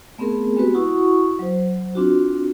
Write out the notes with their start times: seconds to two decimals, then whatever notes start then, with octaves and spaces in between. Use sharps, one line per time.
0.18 A3 B3 C4 G#4 A#4
0.56 G#3 B3 C4 F#4 G4 B4
0.74 E4 F#4 F#5 C#6 D#6
1.39 F#3 C5
1.95 C4 D4 F4 F#4